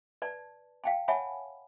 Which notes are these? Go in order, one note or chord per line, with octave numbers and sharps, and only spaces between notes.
B4 D5 A5
F5 G5 A5
C#5 E5 F#5 G#5 A5 B5